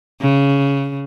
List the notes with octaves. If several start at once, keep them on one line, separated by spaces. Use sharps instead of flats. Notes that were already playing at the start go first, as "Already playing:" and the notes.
C#3